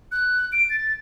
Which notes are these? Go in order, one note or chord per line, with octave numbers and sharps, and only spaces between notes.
F#6
D7
A6